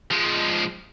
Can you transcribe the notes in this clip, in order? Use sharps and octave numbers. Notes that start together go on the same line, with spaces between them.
F3 G#3